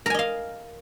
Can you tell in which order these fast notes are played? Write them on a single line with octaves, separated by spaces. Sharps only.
A#4 G#5 D#5 F5